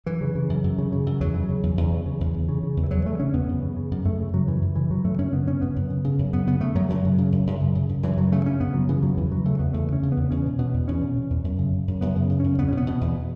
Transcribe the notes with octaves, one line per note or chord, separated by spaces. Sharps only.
F#2 E3
C#3
C#3
F#2
F#2
C#3
C#3
F#2
E2 F#3
C#3
C#3
E2
E2
C#3
C#3
E2
E2
C#3
C#3
E2
E3
E2 F#3
C#3 A3
C#3 C#4
E2 B3
F#2
C#3
C#3
F#2
F#2 A3
C#3
C#3 F#3
F#2 E3
F#2
C#3 E3
C#3 F#3
F#2 A3
F#2 C#4
C#3 B3
C#3 C#4
F#2 B3
F#2
C#3
C#3
F#2
F#2 B3
C#3 B3
C#3 A3
F#2 F#3
F#2 F#3
C#3
C#3
F#2
F#2
C#3
C#3
F#2
F#2 E3
C#3 F#3
C#3 A3
F#2 C#4
F#2 B3
C#3 F#3
C#3 E3
F#2 F#3
E2 E3
C#3 F#3
C#3 A3
E2 B3
E2 A3
C#3 C#4
C#3
E2 B3
E2 C#4
B2
B2 B3
E2
E2 C#4
B2
B2
E2
F#2
C#3
C#3
F#2
F#2 B3
C#3
C#3
F#2 C#4
E2 B3
C#4
B2
B3
B2
E2